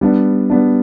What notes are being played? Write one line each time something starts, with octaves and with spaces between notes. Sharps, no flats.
G3 B3 D4
G3 B3 D4